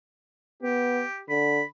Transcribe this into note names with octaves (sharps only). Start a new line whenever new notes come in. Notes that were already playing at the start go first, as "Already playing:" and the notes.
B3 G4
D3 B5